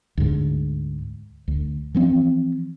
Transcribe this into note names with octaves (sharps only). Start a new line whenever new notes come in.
D2 G#2
D2
E3 F3 C4